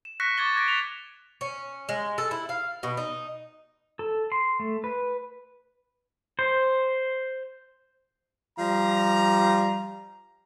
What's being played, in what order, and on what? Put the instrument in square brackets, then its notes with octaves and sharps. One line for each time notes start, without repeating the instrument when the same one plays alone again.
[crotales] E7
C#6 F#6 A#6 B6 C#7
C#6 D6 G#6 A6 G7
D6 G#6 A#6 C#7 D7
B6 F7
[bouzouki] C#4
G#3
A4
E4
F5
B2
D#4
[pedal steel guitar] A4
C6
A3
B4
C5
[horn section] F3 G3 A#5